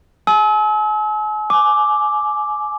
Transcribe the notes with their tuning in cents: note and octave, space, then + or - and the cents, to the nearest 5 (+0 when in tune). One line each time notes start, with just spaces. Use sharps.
G#5 +40 E6 -40
G#5 +25 D6 +0